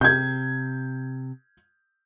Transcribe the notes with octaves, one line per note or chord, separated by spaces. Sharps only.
C3 G6 G#6